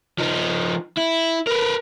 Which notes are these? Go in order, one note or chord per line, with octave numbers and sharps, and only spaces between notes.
F3 D#4
E4
A#4 B4